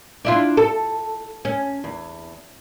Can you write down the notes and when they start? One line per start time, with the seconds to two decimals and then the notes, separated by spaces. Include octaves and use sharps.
0.25 D4 E4 F4
0.57 A4
1.45 C#4
1.84 E2